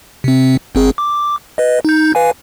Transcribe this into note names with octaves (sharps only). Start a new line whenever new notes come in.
C3 C4
G1 C4 G#4
D6
B4 D#5
D#4 G6
B4 F5 G#5